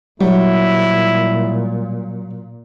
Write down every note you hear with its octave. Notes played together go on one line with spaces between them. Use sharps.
A#2 F#3 G3 E4